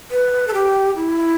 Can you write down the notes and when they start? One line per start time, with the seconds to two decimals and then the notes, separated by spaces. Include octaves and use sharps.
0.11 B4
0.47 A4
0.54 G4
0.96 E4